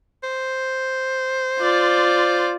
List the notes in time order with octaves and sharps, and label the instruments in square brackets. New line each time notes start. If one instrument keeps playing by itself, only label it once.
[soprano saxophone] C5
[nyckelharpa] F4 D5